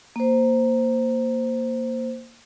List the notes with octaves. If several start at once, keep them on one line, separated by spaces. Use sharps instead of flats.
A#3 C5